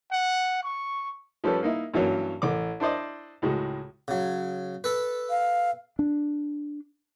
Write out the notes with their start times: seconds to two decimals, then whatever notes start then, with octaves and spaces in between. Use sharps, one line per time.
0.12 F#5
0.63 C#6
1.44 F3 G3 C#4 A4 B4
1.63 A#3 D#4 E4
1.94 G2 E3 F#3 A#3 C#4
2.42 A1 D6
2.80 D4 E4 C5 D5 D#5
3.42 C#2 A2 G#3 F#4
4.08 C#3 F#3
4.84 A4 B4
5.30 F5
5.99 D4